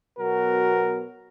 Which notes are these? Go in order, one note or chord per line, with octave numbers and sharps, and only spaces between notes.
B2 F#3 B3 F#4 A#4